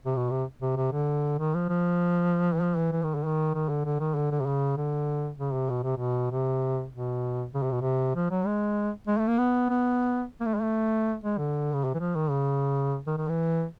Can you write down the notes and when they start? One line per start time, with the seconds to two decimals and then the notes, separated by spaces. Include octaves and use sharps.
0.06 C3
0.16 B2
0.30 C3
0.62 C3
0.76 C3
0.92 D3
1.39 D#3
1.54 F3
1.69 F3
2.54 E3
2.61 F3
2.77 E3
2.92 E3
3.03 D#3
3.15 D3
3.25 D#3
3.54 D#3
3.69 D3
3.85 D3
4.00 D#3
4.15 D3
4.31 D3
4.40 C3
4.46 C#3
4.77 D3
5.38 C#3
5.53 C3
5.69 B2
5.83 C3
5.97 B2
6.31 C3
6.92 B2
7.54 C#3
7.63 C3
7.72 B2
7.81 C3
8.15 F3
8.31 F#3
8.46 G#3
9.07 G#3
9.18 A3
9.27 A#3
9.38 B3
9.69 B3
10.41 A#3
10.46 A3
10.55 G#3
10.62 A3
11.23 G#3
11.38 D3
11.74 C#3
11.84 C3
11.94 E3
11.99 F3
12.15 D#3
12.30 C#3
13.07 D#3
13.17 D#3
13.28 E3